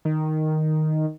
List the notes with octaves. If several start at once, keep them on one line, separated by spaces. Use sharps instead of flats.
D#3